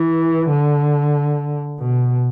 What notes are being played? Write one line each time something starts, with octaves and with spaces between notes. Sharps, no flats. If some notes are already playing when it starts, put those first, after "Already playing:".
Already playing: E3
D3
B2